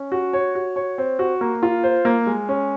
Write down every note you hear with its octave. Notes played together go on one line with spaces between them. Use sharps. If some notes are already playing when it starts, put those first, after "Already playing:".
Already playing: C#4
F#4
C#5
F#4
C#5
C4
F#4
A#3
F4
C5
A#3
G#3
C#4